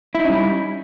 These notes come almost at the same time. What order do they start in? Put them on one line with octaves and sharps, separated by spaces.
E4 D#4 C#4 G3